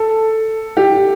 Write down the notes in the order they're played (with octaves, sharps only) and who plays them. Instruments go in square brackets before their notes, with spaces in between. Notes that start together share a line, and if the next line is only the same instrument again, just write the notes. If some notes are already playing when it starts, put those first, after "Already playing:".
Already playing: [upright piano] A4
G4